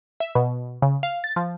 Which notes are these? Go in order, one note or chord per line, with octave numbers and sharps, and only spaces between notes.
E5
B2
C#3
F5
A6
F3